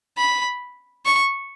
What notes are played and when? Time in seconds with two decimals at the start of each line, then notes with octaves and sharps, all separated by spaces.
0.18 B5
1.06 C#6